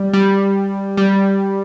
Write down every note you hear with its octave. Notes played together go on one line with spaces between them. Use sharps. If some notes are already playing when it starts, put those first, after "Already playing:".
Already playing: G3
G3
G3